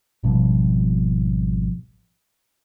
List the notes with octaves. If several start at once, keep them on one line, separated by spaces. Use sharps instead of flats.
G#1 B2 F3 G3